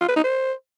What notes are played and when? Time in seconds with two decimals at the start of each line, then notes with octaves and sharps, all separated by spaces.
0.01 F4
0.09 B4
0.17 D#4
0.24 C5